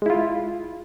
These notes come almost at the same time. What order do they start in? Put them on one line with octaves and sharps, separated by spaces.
G#3 E4 F4